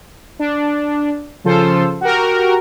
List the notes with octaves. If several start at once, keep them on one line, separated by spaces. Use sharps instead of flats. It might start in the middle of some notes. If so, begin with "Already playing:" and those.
D4
C#3 F3 F4 A4 C5
F#4 G4 A#4